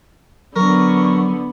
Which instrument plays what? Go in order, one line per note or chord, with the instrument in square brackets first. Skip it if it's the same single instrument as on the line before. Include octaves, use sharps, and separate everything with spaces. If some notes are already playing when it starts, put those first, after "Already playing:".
[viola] D3 B3 [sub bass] F#3 [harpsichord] A#4 [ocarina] C#6